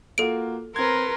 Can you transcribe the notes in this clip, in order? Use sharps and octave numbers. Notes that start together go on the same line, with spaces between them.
A#3 F4 F#4 A4 D7
C4 A#4 B4 C6 G#6